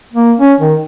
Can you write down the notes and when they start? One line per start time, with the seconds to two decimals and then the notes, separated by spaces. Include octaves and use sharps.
0.13 A#3
0.40 C#4
0.60 D#3